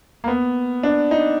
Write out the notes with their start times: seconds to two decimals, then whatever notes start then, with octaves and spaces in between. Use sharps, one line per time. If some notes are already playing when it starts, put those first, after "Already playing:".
0.24 A#3
0.28 B3
0.83 D4
1.11 D#4